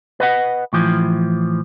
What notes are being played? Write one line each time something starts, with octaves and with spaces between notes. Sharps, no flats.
B4 D#5 F#5
A2 E3 F3